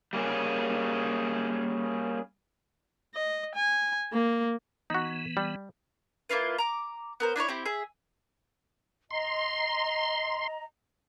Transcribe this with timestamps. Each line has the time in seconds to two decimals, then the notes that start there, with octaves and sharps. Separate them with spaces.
0.13 G3 A#3 C#4 G#4
3.15 D#5
3.55 G#5
4.13 A#3
4.90 E3 B3 D#4 F#4
5.37 G3
6.29 A#3 E4 F4 B4
6.58 A#5 D6
7.20 B3 A#4 C5
7.36 D4 E4 B4 C#5
7.48 C4 E4 G4
7.66 G#4 E5
9.11 D#5 A#5 C6